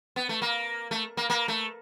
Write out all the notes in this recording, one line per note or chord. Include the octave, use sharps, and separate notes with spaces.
B3
A3
A#3
A3
A#3
A#3
A3